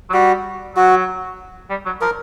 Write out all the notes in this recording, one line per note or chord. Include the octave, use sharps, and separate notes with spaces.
F#3
G3 F#4
F#3 F#4
G3
F#3
F3 A#4